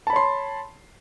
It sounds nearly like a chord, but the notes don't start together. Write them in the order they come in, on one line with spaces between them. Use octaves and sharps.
A5 B5 C#5 C6